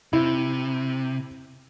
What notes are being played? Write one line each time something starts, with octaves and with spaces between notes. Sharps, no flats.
C3 E4